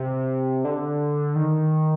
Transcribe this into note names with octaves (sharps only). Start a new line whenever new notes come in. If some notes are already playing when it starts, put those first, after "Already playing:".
Already playing: C3
D3
D#3